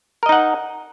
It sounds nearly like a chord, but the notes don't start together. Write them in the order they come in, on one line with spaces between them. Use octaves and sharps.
A#4 D#5 D#4 F#5